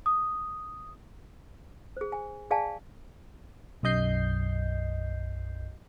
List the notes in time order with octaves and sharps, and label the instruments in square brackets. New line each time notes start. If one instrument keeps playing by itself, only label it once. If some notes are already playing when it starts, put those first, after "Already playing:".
[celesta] D#6
[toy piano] G#4 C5
G#5
G#4 D5 F5 G#5 A5
[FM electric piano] B1 F#2 D#5 G6 C7